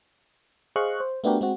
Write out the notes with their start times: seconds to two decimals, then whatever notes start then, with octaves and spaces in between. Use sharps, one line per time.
0.76 G#4 C5 D#5 F5 C#6 F#6
1.00 C5
1.24 A3 B3 D4 F#4 G4 A#4
1.41 G#3 C4 F#4